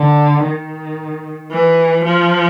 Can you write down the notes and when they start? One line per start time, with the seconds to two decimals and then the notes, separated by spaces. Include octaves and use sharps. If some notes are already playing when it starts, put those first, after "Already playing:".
Already playing: D3
0.45 D#3
1.51 E3
2.03 F3